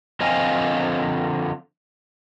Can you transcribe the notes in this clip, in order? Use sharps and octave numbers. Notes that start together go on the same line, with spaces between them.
D3 F3 C4 D#5 F5 G#5